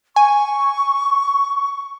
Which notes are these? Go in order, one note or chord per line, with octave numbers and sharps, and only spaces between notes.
G#5 C#6